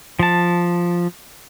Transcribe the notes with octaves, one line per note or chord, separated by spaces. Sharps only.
F3 A5